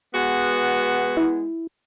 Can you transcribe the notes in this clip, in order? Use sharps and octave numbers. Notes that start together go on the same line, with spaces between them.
G#3 B3 F#4
E4